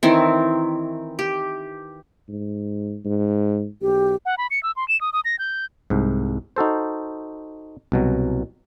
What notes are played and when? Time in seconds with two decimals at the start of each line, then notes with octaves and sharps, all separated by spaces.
0.03 D#3 E3 C4
1.19 G4
2.29 G#2
3.05 G#2
3.82 B1 G4
4.26 F#5
4.38 B5
4.51 C#7
4.63 E6
4.76 C6
4.88 E7
5.01 D#6
5.13 D#6
5.25 A#6
5.39 G6
5.90 C2 G#2
6.56 D#4 F#4 A4 C5
7.92 C2 B2 F#3